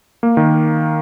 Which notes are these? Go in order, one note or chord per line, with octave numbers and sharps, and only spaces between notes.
A#3
D#3